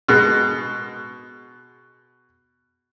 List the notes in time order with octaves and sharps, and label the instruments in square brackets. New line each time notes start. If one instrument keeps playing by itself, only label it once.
[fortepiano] B2 G#3